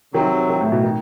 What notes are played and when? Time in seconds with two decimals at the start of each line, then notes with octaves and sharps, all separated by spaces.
0.14 C3 D#3 F#3 C4
0.49 D#3
0.61 A2
0.72 B2
0.83 D#3